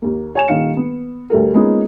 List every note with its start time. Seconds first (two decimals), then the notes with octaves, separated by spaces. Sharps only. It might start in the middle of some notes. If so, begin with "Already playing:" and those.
0.02 D#2 A#3
0.35 C#5 G#5 E7
0.48 D#1 D#3 F5 C#7
0.77 B3
1.30 D2 G3 A4 A#4
1.54 G#3 A#3 B3 C#4 D#4 F4